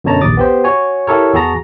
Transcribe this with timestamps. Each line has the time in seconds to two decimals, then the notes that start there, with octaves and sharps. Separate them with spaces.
0.04 F#2 B2 D3 C#5 A5 A#5
0.21 A#1 D#2 D6 D#6 A6
0.37 B3 G4 C5
0.64 F#4 C#5 G#5
1.07 E4 G4 A4 A#4 C#5
1.34 E2 F#4 G#4 A5 A#5 A#6